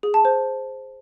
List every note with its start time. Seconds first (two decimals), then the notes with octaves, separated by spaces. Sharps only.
0.03 G#4
0.14 A5
0.25 C5